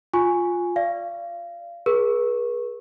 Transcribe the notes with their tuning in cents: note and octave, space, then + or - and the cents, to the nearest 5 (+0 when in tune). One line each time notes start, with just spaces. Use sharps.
F4 +10 G#5 +0 C#6 +0
D5 +0 F5 -25
G#4 +0 B4 -45 C#6 -15